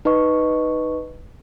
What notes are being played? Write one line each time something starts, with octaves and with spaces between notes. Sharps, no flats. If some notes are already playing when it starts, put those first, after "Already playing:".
D#4 B4 D#5 C#6